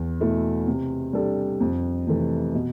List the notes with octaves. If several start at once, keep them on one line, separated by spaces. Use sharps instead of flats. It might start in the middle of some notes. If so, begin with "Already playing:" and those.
Already playing: E2
B2 A3 E4
C3
G3 D4 A4
F2
C3 E3 A3
B2